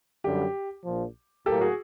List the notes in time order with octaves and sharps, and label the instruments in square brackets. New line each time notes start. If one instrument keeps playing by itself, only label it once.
[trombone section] F#2 D3 G3 [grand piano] G4
[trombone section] A#1 A#2 F3
[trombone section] A2 F#3 A#3 [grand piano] G4 A4
[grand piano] F#4 G#4